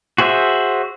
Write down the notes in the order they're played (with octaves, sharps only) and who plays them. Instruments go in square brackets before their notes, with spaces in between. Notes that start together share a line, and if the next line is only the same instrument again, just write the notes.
[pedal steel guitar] F#4 G#4 C5 E5